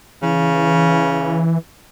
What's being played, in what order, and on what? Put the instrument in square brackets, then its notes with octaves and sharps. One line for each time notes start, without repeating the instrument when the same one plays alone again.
[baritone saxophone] C#3 [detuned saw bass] E3